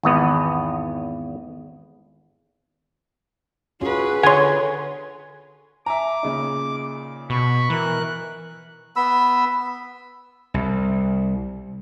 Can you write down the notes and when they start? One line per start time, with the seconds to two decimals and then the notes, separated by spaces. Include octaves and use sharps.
0.03 G#1 E2 B3
3.81 C#4 F4 F#4 G#4 B4
4.23 D3 C#5 F#5 G#5 C6
5.86 E5 G#5 A#5 D6
6.23 A#2 C#3 D#4
7.30 B2 B5 C#6
7.70 E3 A#4 F#6
8.96 B3 B5 E6
10.54 C2